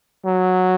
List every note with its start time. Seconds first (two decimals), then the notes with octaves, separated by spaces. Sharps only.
0.25 F#3